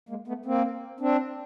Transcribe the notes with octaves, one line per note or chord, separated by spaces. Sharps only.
G#3 A#3
A3 B3
A#3 C4
C4 D4